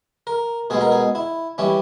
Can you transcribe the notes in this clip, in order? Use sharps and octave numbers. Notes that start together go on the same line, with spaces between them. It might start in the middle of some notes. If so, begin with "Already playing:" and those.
A#4
B2 G#3 B3 G#4
A#4
G#4
E4
E3 G3 C#4 E4